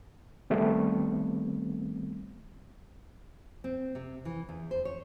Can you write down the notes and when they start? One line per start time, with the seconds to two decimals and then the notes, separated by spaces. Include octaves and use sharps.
0.50 D#3 G3 A3 B3 C4
3.64 C4
3.95 C3
4.25 E3
4.49 E2
4.71 C5
4.85 C#5